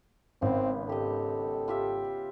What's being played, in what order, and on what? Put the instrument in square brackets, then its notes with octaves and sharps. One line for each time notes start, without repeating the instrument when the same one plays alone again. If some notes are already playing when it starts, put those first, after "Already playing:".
[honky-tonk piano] G#1 [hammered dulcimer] C#3 B3 [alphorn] C4
[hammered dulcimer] G4 D#5 [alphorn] A4
[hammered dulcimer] F4 G4 E5